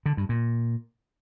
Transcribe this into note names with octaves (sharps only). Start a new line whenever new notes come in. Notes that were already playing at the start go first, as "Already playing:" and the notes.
D3
G2
A#2